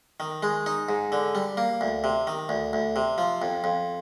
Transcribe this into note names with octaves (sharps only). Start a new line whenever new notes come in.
D#3
G#3
D#4
G#2
D3
G3
A#3
D2
C3
D#3
D2
D2
C3
F3
F2
F2